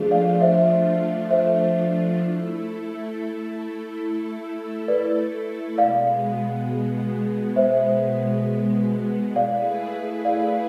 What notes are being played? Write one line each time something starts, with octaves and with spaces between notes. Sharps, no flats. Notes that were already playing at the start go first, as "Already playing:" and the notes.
Already playing: F3 A3 D4 F4 G#4
D5 F5
C5 E5
C5 E5
A3 E4 A4
B4 D5
B2 G#3 B3 D5 F5
C5 E5
A3 E4 G#4 B4 D5 F5
D5 F5